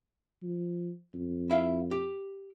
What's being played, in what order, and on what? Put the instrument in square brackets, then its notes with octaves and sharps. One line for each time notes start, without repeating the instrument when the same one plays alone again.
[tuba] F3
F2
[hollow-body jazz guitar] E4 E5 F5
G4